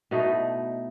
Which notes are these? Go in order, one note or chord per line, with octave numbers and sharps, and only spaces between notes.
B2 A3 D#4 E4